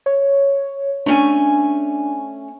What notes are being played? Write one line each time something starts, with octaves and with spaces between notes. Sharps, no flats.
C#5
A3 C#4 D4 G#5